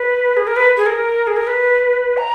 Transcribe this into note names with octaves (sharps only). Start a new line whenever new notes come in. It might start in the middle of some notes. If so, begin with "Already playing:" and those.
Already playing: B4
G#4
A#4
B4
G#4
A#4
G#4
A#4
B4
A#5